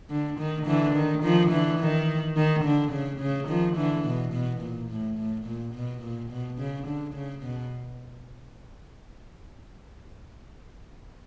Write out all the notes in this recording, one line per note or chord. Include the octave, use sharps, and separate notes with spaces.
D3
D#3
D3 E3
D#3
D#3 F3
D3 E3
D#3
D#3
D3
C#3
C#3
D#3 F3
D3 E3
B2
B2
A#2
A2
A2
A#2
B2
A#2
B2
C#3
D3
C#3
B2